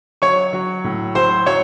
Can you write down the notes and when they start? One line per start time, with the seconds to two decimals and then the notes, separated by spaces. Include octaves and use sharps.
0.22 F#3 C#5 C#6
0.53 F#3
0.84 A2
1.15 F#3 C5 C6
1.46 F#3 C#5 C#6